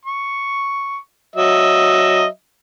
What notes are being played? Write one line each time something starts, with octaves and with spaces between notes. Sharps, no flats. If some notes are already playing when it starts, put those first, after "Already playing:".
C#6
F#3 D#5 E5